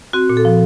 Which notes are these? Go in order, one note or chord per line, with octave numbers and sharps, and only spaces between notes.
C4 F#4
A#2
A4
F3